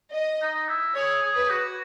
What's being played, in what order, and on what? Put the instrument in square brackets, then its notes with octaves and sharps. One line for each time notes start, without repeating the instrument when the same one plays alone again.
[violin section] D#5
[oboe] D#4
E4
[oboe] G#4 [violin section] C#5
[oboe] G#4
[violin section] B4
[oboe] F#4